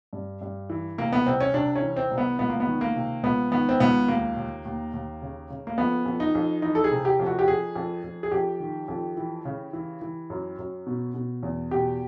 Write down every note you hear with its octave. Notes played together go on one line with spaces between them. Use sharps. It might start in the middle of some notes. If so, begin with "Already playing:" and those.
G2
G2
E3
C3 A#3
B3
C2 C4
C#4
C3 D4
C#4
E3
C4
C2
B3
C#2 B3
A#3
B3
D#3
A#3
C3
C#2 B3
D#3 B3
C4
C#2 B3
D#2 A#3
D#2
D#2
D#2
C#3
C#3
A#3
F2 B3
F2
D#4
F2
E3 D#4
A4
G#4
C3
G4
F2
F#4
G4
F2 G#4
F2
F2
G#4
F2 G4
D#3
F2
E3
C#3
E3
E3
F#2
F#2
B2
B2
E2
B2 G4